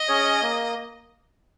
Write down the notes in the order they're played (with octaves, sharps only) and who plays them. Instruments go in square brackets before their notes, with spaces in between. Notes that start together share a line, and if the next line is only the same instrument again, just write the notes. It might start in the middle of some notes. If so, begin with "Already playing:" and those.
Already playing: [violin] D#5
[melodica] C#4 G#4 C#5
A#3